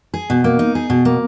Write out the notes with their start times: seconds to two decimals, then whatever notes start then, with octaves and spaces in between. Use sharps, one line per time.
0.14 G#4
0.30 B2
0.44 A#3
0.59 D#4
0.75 G#4
0.90 B2
1.05 A#3